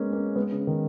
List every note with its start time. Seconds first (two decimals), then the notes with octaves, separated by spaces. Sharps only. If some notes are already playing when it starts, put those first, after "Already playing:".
Already playing: G#3 A#3 B3 C#4
0.13 A#3 C#4
0.35 G#3 B3
0.52 C#3
0.67 D#3